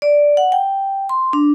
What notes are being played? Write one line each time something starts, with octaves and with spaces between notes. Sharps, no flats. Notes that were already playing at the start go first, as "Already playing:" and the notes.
D5
F#5
G5
C6
D4